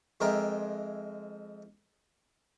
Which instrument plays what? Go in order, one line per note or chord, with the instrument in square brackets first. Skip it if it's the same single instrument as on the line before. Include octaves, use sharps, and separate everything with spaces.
[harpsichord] F2 G#3 A#4 C5 E5 G5